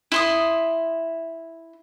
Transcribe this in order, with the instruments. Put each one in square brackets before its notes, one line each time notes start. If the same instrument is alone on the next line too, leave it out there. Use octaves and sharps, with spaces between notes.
[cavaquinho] E4 C6 D#6